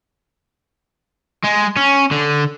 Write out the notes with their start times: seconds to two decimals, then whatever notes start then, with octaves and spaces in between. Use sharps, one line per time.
1.44 G#3
1.76 C#4
2.11 D3